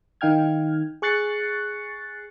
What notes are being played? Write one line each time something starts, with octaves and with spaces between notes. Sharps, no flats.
D#3 D#4 F5 G5 F6 G#6
G#4 C#6 F#6 A6 C7 C#7